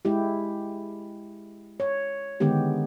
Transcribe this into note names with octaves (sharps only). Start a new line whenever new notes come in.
G#3 E4 G4
C#5
D3 D#3 G#3 B3 G4